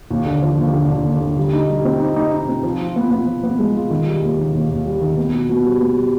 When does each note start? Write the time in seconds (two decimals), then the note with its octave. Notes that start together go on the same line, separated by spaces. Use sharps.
0.10 D#2
0.26 D3
0.42 F3
0.58 D#2
0.74 D3
0.90 D3
1.06 D#2
1.22 D3
1.37 G3
1.53 D#4
1.69 G3
1.85 C4
2.00 D#4
2.16 D#4
2.32 D#4
2.49 C4
2.63 F3
2.80 F4
2.96 B3
3.11 B3
3.27 F3
3.44 B3
3.59 G#3
3.74 F4
3.90 D#3
4.07 G3
4.22 D#2
4.38 D#3
4.55 D#2
4.70 D#2
4.86 G3
5.01 D#3
5.17 B3
5.33 B2
5.49 B2
5.65 G3
5.81 B3
5.96 G3